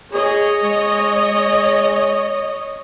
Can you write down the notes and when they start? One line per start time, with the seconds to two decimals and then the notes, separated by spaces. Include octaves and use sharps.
0.13 G#4 C#5 D#5
0.61 G#3